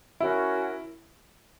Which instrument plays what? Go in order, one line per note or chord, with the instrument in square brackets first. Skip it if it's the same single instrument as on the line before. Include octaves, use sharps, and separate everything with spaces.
[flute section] C#4 F#4 A#4 [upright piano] E4